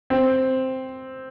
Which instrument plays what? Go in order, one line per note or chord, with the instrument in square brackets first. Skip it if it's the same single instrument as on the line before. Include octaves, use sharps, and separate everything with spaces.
[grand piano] C4